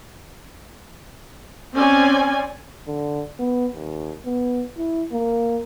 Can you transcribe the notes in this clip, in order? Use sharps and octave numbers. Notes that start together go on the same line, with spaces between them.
C4 C#4 D5 G#5
D3
B3
D#2
B3
E4
A#3